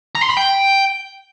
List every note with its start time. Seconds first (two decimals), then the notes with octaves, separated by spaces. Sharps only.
0.15 A#5
0.22 C6
0.30 B5
0.37 G5